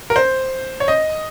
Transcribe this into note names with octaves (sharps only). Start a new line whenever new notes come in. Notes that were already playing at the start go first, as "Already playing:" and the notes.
A#4
C5
C#5
D#5